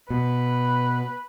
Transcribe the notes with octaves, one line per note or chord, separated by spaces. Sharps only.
B2 B4